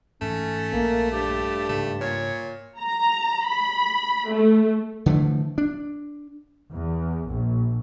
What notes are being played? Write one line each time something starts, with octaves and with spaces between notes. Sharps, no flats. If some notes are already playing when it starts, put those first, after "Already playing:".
G#2 E3 A3 C#4
A#1 A#3
G2 G4
G#2 C#3 A3
A#2 C#5
A#5
B5
A3
D3 E3 F3 A3
D4
E2
A#1